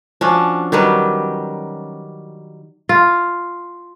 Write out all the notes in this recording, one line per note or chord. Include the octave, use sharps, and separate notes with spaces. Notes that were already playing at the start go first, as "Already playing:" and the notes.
F3 C#4 D4 F#4
D#3 F#3 G3 B4
F4